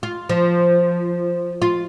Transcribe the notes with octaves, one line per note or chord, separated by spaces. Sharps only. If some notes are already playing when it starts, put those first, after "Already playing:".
F4
F3
F4